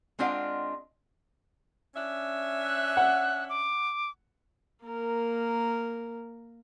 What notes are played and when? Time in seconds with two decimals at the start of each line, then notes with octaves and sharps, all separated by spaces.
0.19 G#3 C4 D4 F4 D#5 F#5
1.95 C#4 D4 E5
2.65 F#6
2.97 F#5
3.49 D6
4.85 A#3 A#4